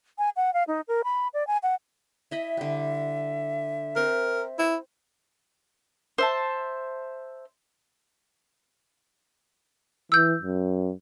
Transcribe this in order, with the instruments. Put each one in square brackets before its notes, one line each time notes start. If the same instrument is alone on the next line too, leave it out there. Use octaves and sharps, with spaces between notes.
[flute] G#5
F#5
F5
D#4
A#4
B5
D5
G#5
F#5
[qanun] E4 D#5 B5 [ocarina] E5
[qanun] D3 G3
[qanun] C4 [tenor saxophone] A#4
[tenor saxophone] E4
[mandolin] C5 E5 A5
[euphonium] E3 [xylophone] E6 G6
[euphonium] F#2